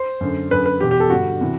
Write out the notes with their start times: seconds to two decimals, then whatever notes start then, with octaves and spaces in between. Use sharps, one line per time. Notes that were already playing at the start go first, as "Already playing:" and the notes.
Already playing: C5
0.21 F#2 D3
0.51 F#2 D3 B4
0.66 B4
0.80 E2 B2 G4
0.91 G4
1.00 A4
1.10 G2 D3 F#4
1.41 C3 E3